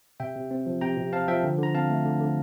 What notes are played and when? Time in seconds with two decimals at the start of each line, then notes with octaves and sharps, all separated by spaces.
0.20 C3 E5 G5
0.36 C3
0.51 C4
0.66 F3
0.81 C3 G5 A#5
0.97 C3
1.13 C4 F5 A5
1.28 F3 E5 G5
1.43 D3
1.59 D3 A#5
1.75 C4 F5 A5
1.90 A3
2.05 D3
2.21 D3